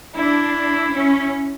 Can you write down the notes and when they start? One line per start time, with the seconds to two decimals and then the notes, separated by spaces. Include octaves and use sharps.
0.15 D4 E4
0.93 C#4